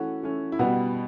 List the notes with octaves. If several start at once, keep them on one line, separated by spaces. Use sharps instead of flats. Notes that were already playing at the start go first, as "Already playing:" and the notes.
Already playing: E3 A3 C#4 F#4
E3 A3 C#4
E4
B2 G3 B3 F#4